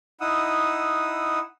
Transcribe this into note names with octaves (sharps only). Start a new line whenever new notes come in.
D#4 E4 F#5 D#6 E6